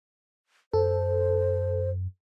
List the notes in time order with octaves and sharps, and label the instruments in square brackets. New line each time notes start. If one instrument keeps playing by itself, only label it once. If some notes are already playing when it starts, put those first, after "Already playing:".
[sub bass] F#2 [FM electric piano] A4 [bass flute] C5